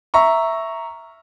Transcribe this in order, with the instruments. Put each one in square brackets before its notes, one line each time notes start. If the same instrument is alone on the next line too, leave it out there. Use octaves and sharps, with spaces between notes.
[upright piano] E5 A#5 C#6